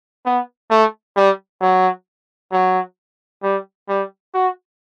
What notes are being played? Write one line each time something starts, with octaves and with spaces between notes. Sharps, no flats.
B3
A3
G3
F#3
F#3
G3
G3
F#4